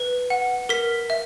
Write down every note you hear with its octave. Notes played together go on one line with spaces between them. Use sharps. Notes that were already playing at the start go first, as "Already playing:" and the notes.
Already playing: B4
F#5
A#4 B6
E5